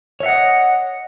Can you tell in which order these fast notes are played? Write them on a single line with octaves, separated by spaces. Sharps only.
C#5 E5 F#5 D#5